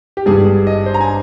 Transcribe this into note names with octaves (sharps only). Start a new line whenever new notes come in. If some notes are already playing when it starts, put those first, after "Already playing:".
G4
G#1 G2 G3 G#4
G#4
D#5
C5
A#5
G#5